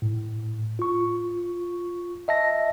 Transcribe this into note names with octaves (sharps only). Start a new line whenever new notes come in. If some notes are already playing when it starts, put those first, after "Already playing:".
A2
F4 C#6
D#5 E5 A5 A#6